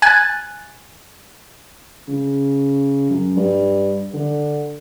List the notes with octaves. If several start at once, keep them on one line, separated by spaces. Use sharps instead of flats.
G#5 F#6 G#6 A6
C#3
F#2
G2
D3